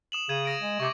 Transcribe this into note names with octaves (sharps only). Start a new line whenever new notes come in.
D#6 E7 F#7
C#3 G#6 D#7 F#7
D#6 A#6 D7
G#3
C3 C#6 D6